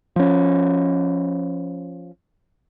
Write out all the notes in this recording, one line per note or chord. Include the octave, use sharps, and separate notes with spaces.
F3 C#4